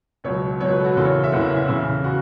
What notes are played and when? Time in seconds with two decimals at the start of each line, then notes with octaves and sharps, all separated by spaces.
0.24 C#2 B2 F#3 C#5
0.61 C#2 B2 F#3 C#5
0.72 B4
0.79 A4
0.84 F#4
0.97 F#1 E2 C#3 E3 A4
1.05 C#5
1.24 E5
1.32 F#1 E2 C#3 E3 F#5
1.45 E5
1.56 E5
1.68 E2 C#3 E3
2.04 C#3 F#4